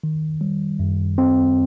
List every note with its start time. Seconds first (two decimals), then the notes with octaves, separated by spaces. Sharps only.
0.04 D#3
0.41 G3
0.79 F#2
1.18 C4